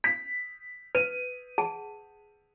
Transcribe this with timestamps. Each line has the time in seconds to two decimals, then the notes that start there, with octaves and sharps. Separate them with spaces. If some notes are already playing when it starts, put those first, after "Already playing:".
0.04 B6
0.95 B4 D#7
1.58 G#4 F#5 A5